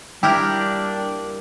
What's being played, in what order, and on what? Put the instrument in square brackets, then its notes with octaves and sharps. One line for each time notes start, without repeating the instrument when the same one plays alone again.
[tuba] G3 [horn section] A#3 D4 [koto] E4 G4 A#4 [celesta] G5